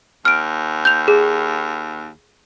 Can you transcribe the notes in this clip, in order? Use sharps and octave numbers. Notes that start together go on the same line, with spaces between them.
D#2 F6 D7
G6 F7
G#4